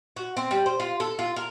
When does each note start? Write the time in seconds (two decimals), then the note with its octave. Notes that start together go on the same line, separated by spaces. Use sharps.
0.16 F#4
0.37 C4
0.51 G3
0.66 C5
0.80 F4
1.00 A4
1.19 F4
1.36 A#4